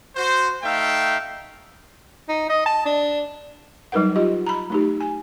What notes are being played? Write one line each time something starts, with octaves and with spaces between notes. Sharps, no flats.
F#4 C5
A3 D#4 E5 F5 G5
D#4
D#5
A5
D4
F#3 G3 D#4 A#4 B4 F#5
F4 G4 D#5
A#5 B5
A3 D#4 G4
G#5